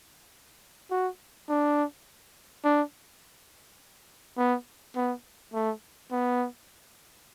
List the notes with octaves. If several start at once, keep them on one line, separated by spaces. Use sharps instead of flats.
F#4
D4
D4
B3
B3
A3
B3